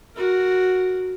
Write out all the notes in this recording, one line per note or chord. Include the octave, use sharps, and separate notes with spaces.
F#4 A#4